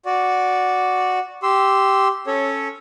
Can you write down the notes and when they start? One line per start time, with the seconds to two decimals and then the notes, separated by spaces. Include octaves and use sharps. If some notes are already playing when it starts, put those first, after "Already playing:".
0.06 F#4 D5
1.43 G4 C6 E6
2.27 C#4 A4 C#5